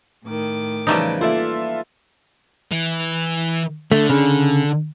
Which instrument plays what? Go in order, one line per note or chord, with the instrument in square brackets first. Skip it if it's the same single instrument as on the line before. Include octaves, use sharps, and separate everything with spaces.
[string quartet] A2 D#3 D6
[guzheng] C#3 E3 F3 [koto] G3 A3 D#4
[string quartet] A#3 [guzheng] E4 D5 [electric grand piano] F4 A4 E5
[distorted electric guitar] E3
[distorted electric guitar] D3 [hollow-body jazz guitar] A3
[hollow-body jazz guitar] C#3